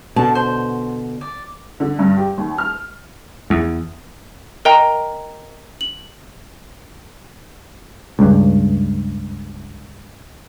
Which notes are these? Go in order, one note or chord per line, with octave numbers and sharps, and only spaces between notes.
B2 D3 A5
C5
D5
D3
G2
G4
D#2
F6
E2
A#4 D#5 G5 A#5
F#7
C#2 G2